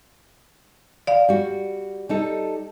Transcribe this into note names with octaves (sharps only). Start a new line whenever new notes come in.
D5 F5
G3 F#4
G3 D#4 A4